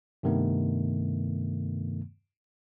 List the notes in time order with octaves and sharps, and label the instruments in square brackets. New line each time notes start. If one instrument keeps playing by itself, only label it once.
[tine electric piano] G2 C3 D#3 A3 B3